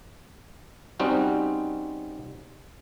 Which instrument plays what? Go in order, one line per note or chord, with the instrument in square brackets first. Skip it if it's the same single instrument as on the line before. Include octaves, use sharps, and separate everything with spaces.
[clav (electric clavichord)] G3 C4 C#4 D#4 F#4